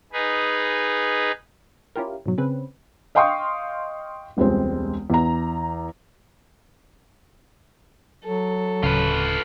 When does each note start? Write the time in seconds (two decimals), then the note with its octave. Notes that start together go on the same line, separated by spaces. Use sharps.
0.13 D#4 G#4 B4
1.96 C#4 E4 F4 G4 A#4
2.26 G#2 B2 F#3
2.38 C#3 C4 C#4 B4
3.15 D#5 F5 G5 C6 C#6 D#6
4.37 E1 C#2 G3 G#3 C4
5.10 E2 A#5
8.25 F#3 A4
8.83 D1 C#3 F4 B4